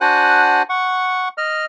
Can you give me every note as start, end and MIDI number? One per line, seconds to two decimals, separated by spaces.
0.01 0.63 62
0.01 0.63 66
0.01 0.63 72
0.01 0.63 78
0.01 0.63 80
0.01 0.63 90
0.69 1.28 78
0.69 1.28 85
1.38 1.65 75
1.38 1.65 89